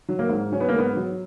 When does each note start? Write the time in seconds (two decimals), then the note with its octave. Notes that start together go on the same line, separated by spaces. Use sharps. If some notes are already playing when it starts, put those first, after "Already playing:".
0.09 F#3
0.19 A#3
0.29 G#2
0.52 F#3 C#4
0.60 B3
0.69 A#3
0.74 G#2 B3
0.96 F#3